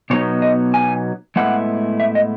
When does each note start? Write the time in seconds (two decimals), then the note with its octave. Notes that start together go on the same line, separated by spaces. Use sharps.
0.10 B2 F#3 B3 D#4 C#5
0.42 D#5
0.74 G#5
1.36 A2 G#3 B3 E4 F#5
2.00 E5
2.15 D#5